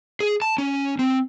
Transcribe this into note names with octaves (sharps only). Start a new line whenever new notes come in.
G#4
A5
C#4
C4